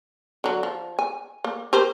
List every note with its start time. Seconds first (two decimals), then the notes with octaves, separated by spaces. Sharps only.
0.44 D3 F#3
0.63 F3
0.99 G#5
1.44 A#3
1.73 G4 A#4 C5